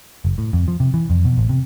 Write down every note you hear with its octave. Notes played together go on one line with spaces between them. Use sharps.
F#1
A2
F2
F3
C3
E3
F2
B2
A1
C3